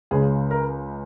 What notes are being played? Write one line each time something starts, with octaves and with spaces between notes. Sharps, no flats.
C#2 C#3 G#3 G#4
A#4